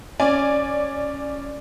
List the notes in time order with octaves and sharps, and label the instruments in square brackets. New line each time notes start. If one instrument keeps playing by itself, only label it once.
[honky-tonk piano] C#4 D5 G#5